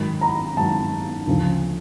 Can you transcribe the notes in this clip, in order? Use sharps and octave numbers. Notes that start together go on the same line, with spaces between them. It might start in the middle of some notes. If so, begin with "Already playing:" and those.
Already playing: G#2 D#3 F#3 B5
A#5
G#2 D#3 F#3 A5
D2 C#3 F3